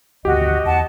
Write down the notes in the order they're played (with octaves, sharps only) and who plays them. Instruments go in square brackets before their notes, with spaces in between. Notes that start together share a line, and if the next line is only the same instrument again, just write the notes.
[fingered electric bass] G#1 D2 D3 [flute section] F#4 [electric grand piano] G4 [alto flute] D#5
[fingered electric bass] E2 [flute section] F#5 A5